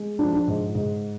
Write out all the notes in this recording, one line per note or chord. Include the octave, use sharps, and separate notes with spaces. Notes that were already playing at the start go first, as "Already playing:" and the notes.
Already playing: G#3
F3 D4
D4
G#2
G#2